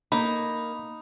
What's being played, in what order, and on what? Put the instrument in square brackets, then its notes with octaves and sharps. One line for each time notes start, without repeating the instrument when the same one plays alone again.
[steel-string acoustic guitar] A#3 [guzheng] D#4 [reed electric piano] B5